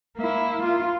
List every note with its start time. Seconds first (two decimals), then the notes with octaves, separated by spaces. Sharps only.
0.17 A#3 E4
0.63 F4